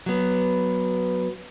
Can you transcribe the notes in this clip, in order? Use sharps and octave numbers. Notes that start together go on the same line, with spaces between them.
F#3 B3